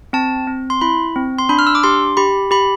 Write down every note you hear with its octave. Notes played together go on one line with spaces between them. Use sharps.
C4 A5
C4
C6
E4 B5
C4
C6
D4 B5
F6
E6
D6
G4 C6
G4 B5
G4 B5